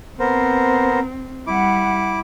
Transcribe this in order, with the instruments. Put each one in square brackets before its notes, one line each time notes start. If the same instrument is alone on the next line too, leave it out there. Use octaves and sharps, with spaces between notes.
[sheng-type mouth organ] B3 A#4 C5 [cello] C4
[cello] G3 F#5 [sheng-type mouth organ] E4 D6